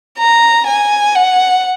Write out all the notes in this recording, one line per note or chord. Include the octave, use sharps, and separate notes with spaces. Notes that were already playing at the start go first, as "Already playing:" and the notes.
A#5
G#5
F#5